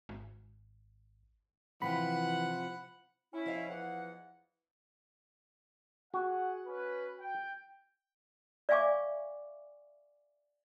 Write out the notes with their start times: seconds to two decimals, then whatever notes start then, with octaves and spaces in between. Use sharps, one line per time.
0.09 G#1
1.82 C3 E3 F3 F4 F#5 B5
3.34 C#4 E4
3.46 F3 D#5 F5
3.69 E2 F#5
6.14 F#4 G#4 F#5
6.65 C#4 B4
7.19 G5
8.69 D5 E5 F5 G#5 C#6 D6